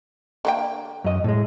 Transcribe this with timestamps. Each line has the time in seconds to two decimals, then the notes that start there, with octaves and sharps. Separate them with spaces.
0.45 D3 A#3 G5
1.04 F#2 D#5
1.24 A2 G#3